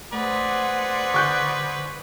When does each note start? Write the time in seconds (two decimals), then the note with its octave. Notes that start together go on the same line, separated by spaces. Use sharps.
0.13 A3 G#4 B4 C5 D5 F#5
1.14 D3 C#6 F#6 G6